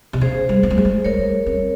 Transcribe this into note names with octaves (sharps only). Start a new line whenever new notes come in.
C3
C#3 G#4 C5
G3
A#3
G#3
G3
G#3
G#3 A#4 C#5
G3
C4